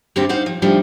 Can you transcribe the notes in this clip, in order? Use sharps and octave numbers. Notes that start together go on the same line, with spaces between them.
G2 D3 G3 A3 C4 G4
D#4 C5 F5 F#5
F3
D3 D#3 F3 G3 A3 D#4